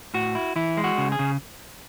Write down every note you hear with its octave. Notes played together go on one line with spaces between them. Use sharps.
A2 F#4
E4
E3 E4
G#3
F#4
C#3
G#4
C#3